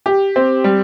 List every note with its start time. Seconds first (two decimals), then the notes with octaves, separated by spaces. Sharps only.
0.06 G4
0.36 C4
0.64 G3